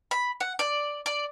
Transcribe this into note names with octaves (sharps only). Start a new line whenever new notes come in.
B5
F#5
D5
D5